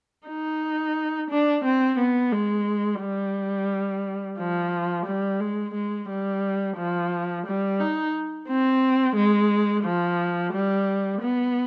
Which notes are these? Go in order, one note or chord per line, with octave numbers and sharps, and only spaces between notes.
D#4
D4
C4
B3
G#3
G3
F3
G3
G#3
G#3
G3
F3
G3
D#4
C4
G#3
F3
G3
B3